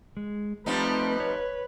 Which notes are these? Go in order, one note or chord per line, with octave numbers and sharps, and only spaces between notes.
G#3
F3 G3 A3 C4 D#4 B4
C#5